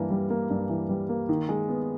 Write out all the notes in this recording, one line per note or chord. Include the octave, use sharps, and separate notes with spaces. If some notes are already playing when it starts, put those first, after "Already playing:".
Already playing: G2 E3 A#3
G3
A#3
G2
E3
G3
A#3
D#3
G#3
B3